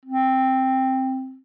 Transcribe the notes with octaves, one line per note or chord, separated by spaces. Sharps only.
C4